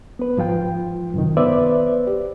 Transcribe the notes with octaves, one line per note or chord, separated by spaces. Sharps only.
B3 B4
G#2 F3 F4 G5
F#2 C3 D#3
B3 B4 C5 D5 E5
G4